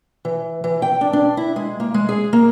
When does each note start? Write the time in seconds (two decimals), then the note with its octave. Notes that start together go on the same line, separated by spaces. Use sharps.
0.25 E3
0.64 E3
0.82 G5
1.01 D4
1.13 D4
1.37 E4
1.56 G#3
1.80 A#3
1.94 G#3
2.09 G#4
2.33 A#3